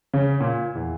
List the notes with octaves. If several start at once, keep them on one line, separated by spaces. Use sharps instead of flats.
C#3
A#2
E2